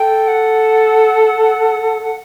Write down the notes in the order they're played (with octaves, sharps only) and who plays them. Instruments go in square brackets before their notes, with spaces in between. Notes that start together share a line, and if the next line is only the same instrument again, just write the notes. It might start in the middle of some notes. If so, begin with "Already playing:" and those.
Already playing: [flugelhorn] A4 [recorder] G5
[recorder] F#5